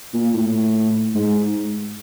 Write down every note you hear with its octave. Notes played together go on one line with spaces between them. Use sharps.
A#2
A2
G#2